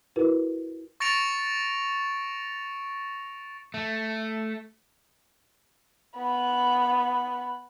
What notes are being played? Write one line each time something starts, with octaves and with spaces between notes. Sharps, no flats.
E4 F#4 A#4 B4
C#6 A6 A#6 C#7 D7 F7
A3
B3 B5